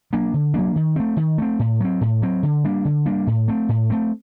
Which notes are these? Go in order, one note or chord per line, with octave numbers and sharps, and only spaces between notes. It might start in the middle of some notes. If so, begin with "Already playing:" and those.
F#3 A#3 D4
D3
F#3 A#3 D4
D#3
A3 C4
D#3
A3 C4
A2
F#3 C4
A2
F#3 C4
D3
G3 A#3 D4
D3
G3 A#3 D4
A2
A3 C4
A2
A3 C4